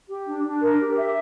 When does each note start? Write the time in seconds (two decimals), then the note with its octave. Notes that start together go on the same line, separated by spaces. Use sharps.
0.08 G4
0.26 D4
0.44 D4
0.61 A#4
0.79 G4
0.97 E5